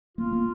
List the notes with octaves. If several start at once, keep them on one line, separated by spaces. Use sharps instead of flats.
A#3 F4
A#3